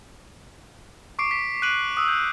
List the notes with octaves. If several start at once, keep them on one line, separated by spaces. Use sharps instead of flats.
C#6 D6 C7 D7
B6
F#6 D7 D#7 F#7
D#6 E6
G6